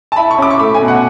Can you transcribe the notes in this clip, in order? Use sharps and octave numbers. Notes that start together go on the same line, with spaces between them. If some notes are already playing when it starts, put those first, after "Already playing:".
A5
E4 B5
C#6
C#4 D6
C#6
A3 B5
G#5
B2
F#5